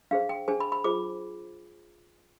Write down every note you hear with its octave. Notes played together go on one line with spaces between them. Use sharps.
D4 G#4 C5 F5
G5
D4 G#4 C5 G#5
B5
B5
F4 G#4 C5 D6